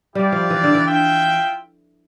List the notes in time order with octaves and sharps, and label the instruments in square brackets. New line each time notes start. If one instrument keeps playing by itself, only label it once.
[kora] G3 [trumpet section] E4 G4 D5 F5
[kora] F3
E3
D3
E3
[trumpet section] F4 E5 G5